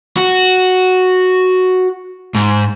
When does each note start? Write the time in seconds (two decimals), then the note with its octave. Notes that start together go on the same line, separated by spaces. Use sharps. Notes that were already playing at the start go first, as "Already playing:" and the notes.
0.17 F#4
2.35 G#2